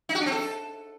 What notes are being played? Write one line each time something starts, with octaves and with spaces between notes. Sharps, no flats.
D#4
F#4
D4
C4
A4